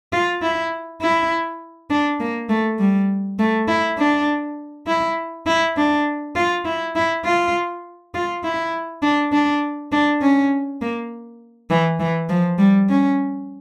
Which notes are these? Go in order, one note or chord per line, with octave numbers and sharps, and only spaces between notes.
F4
E4
E4
D4
A#3
A3
G3
A3
E4
D4
E4
E4
D4
F4
E4
E4
F4
F4
E4
D4
D4
D4
C#4
A#3
E3
E3
F3
G3
C#4